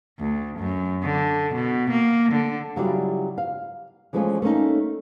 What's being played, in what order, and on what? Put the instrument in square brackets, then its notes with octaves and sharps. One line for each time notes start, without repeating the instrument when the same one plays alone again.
[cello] D2
F#2
D3
B2
A#3
D3
[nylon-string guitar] C#3 F#3 G3 E4 F4 D5
F5
E3 F3 G#3 A3 C#4 F4
A3 A#3 C#4 D#4